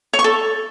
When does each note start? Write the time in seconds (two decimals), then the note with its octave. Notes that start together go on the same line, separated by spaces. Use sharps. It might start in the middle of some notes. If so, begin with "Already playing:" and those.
0.13 C#5
0.19 C#6
0.24 A4